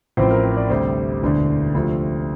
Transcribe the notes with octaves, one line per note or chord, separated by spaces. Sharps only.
A1 A2 F3 C4 C5
A#4
C5
D5
D2 C3 G3 C5
E1 D2 D3
D2 C3 F3 C4